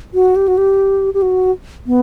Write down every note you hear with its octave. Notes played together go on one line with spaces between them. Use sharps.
F#4
G4
F#4
G4
G4
F#4
B3